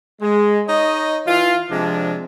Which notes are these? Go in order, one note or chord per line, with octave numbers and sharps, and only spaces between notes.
G#3
D#4 C#5 D#5
E3 F4
C3 F3 G#3 D4